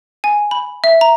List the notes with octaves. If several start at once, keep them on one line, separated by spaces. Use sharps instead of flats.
G#5
B5
E5
A#5